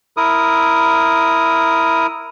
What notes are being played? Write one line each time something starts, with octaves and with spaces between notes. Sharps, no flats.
E4 A#4 D#6